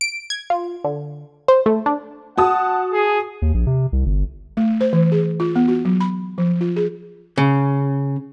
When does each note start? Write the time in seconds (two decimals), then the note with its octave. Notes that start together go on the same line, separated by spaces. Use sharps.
0.01 D7
0.30 G#6
0.50 F4
0.84 D3
1.48 C5
1.66 A3
1.86 D4
2.38 F#4 F#5 A5 D#6
2.92 G#4
3.42 D#2
3.54 A#1
3.67 C3
3.93 C2
4.06 G1
4.57 A3
4.81 C5
4.93 E3
5.12 G#4
5.40 F4
5.56 B3
5.68 F#4
5.85 F#3
6.01 B5
6.38 F3
6.61 F4
6.76 G#4
7.38 C#3